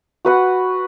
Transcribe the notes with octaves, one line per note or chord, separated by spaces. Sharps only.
F#4 B4 F#5